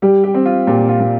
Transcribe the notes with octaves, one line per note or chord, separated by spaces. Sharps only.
G3 G4
G4
C4
F4
A#2 G4
F4
A#2